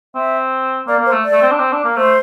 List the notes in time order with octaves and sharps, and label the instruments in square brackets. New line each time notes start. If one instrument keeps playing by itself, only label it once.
[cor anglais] C4 [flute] E5
[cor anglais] A#3 [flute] D5
[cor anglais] A#3
[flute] C5
[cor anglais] A3
[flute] D5
[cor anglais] A3
C4
D4
C4
D4
A#3
[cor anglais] A3 [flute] C5